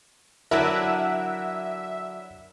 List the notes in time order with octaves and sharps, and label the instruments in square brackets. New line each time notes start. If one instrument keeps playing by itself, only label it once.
[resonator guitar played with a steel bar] D3 F#3 D4 [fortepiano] E4 A#4 [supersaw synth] E5